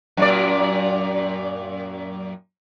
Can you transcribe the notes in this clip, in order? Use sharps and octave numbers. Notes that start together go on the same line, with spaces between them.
F#2 A#2 D5